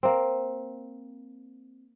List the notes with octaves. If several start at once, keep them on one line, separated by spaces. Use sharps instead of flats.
A#3 C4